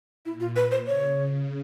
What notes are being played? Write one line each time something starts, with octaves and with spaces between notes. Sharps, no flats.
A#2 E4
F4
B4
C5
C#3 C#5